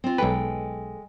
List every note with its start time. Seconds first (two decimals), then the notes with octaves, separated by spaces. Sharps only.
0.04 C4 F4
0.18 B1 G#3 A4 B4 G5